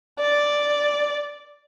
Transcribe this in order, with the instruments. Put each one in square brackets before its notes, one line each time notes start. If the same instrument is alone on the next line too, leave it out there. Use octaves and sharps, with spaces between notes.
[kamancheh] D5